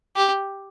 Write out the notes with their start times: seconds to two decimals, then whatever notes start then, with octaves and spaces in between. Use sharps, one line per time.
0.16 G4